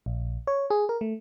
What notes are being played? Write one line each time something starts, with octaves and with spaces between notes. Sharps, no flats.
A#1
C#5
G#4
A#4
A3